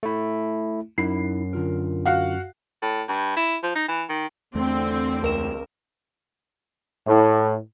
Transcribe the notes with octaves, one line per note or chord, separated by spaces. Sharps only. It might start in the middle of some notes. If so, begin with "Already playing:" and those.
A3 E4
F#2 D#4 E4 B5 C7
D3 F4 A#4
F#4 F5 F#5
A2
G2
E4
F3
D#4
E3
D#3
E2 D3 A3 C4
C#2 A#4 E7
A2